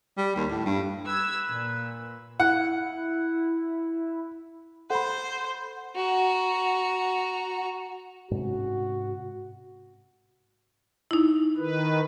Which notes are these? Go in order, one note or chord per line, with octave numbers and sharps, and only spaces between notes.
G3
D#2
A2
G2
B4 E6 G#6
A#2
E4 F#5
A4 C5 F#5 B5
F#4 A#5
G#2 C3 C#4 F#4
D#4 E4
D#3 B4